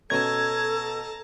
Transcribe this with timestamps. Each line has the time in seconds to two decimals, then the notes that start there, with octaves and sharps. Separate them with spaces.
0.10 B2 C#4 A4 A5 A#5 G#6